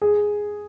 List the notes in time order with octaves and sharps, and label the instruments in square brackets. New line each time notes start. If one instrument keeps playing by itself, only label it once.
[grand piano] G#4